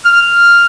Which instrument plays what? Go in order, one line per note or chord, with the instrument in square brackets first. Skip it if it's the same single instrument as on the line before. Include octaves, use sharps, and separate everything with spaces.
[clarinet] F6